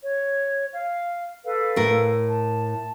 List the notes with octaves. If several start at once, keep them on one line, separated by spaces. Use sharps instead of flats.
C#5
F5
A4 B4 F5
A2 A#4
A5